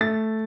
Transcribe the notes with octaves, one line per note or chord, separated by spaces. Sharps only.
A3 A6